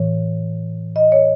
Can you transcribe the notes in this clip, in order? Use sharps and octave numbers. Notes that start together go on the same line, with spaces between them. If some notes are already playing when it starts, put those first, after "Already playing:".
Already playing: A2 E3 C#5
D#5
C#5